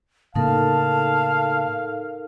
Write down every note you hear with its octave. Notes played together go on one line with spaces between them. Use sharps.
A2 C#3 A#3 D#4 A4 A#4 F5 A5